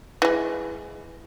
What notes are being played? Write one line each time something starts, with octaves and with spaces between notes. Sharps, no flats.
E3 G#3